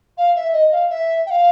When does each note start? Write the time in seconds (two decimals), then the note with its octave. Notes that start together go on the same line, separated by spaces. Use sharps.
0.18 F5
0.35 E5
0.53 D#5
0.72 F5
0.90 E5
1.26 G5
1.30 F5